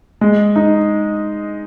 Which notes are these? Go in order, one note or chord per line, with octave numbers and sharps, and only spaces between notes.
G#3
D#4